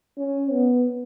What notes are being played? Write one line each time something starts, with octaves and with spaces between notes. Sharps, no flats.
C#4
B3